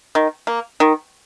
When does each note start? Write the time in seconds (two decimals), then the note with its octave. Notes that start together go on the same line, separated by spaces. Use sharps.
0.15 D#3
0.47 A#3
0.80 D#3